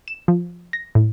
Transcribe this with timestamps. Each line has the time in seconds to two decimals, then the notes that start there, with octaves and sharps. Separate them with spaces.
0.08 E7
0.28 F3
0.73 A#6
0.95 A2